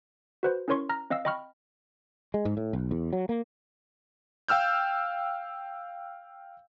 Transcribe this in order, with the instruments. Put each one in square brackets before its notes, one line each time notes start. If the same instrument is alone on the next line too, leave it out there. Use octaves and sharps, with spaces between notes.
[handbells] F#4 B4 C5
C#4 E4 A#4 C#5 C6 C#6
A#5 F6 A#6
C4 D#5 F5 E6
D#5 G5 B5 C#6 F6
[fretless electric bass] G#3
G#2
A2
B1
E2
F#3
A#3
[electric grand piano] F5 G5 E6 F6 G6